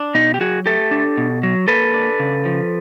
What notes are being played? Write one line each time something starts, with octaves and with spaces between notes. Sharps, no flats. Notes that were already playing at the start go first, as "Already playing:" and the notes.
Already playing: D4
B2 D#4
G4
F#3 F#4 G#4
A3 G4 A4
D4
B2
F#3
A#3 A4 B4
D4
C#3
F3